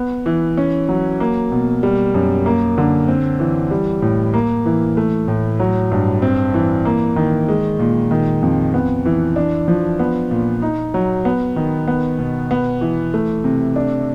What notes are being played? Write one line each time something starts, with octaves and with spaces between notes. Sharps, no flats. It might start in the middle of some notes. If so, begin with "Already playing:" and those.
Already playing: B3
E3
C#4
F#3
A#3
B2
G3
F#2
A#3
D3
C4
E3
G3
A2
A#3
E3
A3
A2
F#3
G2
C4
E3
A#3
D#3
G#3
A#2
D#3
F2
B3
E3
D4
F3
B3
A#2
D#4
F#3
B3
D#3
B3
B2
B3
E3
A3
C3
D4